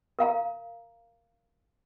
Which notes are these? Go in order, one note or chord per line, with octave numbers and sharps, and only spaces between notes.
A#4 F5 A#5